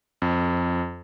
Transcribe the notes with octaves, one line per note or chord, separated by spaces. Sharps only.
F2